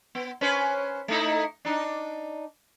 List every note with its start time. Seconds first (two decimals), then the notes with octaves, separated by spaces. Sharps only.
0.15 B3
0.41 C#4 B4 C5
1.08 A3 D#4 E4
1.65 D4 D#4